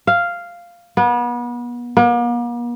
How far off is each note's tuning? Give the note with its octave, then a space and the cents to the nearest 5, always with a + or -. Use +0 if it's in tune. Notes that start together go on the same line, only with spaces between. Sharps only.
F5 -5
B3 -35
A#3 +45